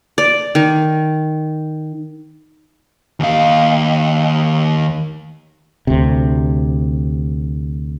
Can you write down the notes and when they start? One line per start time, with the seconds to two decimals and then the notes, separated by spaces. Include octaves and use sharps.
0.18 D5
0.55 D#3
3.20 D#2 F5
5.87 D2 C3